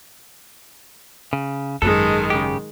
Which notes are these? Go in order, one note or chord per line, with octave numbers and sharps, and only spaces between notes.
C#3
G#1 F#2 D#3 G#3 A4
C#3 G4